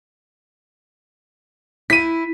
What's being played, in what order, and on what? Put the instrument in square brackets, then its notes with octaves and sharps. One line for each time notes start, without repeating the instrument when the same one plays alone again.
[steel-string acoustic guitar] E4 [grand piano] B6 D#7